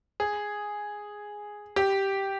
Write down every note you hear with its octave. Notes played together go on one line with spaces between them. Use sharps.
G#4
G4